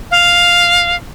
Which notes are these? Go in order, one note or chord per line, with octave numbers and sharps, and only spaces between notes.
F5